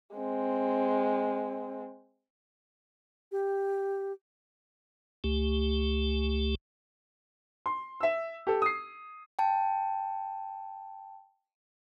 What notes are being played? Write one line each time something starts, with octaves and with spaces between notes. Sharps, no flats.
G#3 C4
G4
C#2 A3 G4
C6
E5 E6
G4 A4
D#6 C7
G5 A5